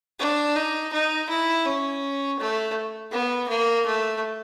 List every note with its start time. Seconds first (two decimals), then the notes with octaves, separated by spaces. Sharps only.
0.19 D4
0.56 D#4
0.93 D#4
1.29 E4
1.65 C#4
2.39 A3
3.12 B3
3.49 A#3
3.86 A3